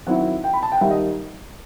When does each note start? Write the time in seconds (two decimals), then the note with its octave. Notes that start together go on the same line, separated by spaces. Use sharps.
0.06 D#3 F#3 C4 E4 F#5
0.44 G5
0.53 B5
0.63 A5
0.72 G5
0.77 F#5
0.81 D#3 G3 D#4 E5
0.90 D#5